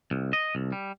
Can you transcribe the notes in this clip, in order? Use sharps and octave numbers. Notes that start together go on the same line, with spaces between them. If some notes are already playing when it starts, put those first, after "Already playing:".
C2
D#5
C2
G3